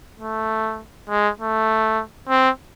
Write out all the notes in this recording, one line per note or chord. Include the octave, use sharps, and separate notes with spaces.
A3
G#3
A3
C4